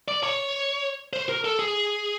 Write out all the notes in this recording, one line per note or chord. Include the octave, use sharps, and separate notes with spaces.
D5
C#5
C5
A#4
A4
G#4